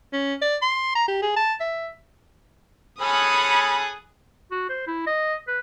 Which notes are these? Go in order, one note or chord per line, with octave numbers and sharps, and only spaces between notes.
C#4
D5
C6
A#5
G4
G#4
A5
E5
C#4 G#4 A4 B5 D#6 F#6
F#4
C5
E4
D#5
B4